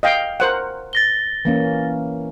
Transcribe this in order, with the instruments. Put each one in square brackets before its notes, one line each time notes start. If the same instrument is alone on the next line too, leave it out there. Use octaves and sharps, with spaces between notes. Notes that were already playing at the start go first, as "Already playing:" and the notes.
[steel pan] D#5 F5 G5
A#4 C5 F#5
[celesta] A6 A#6 G7
[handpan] E3 A#3 C#4